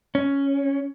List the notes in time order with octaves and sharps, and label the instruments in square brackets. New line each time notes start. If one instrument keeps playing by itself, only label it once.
[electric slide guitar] C#4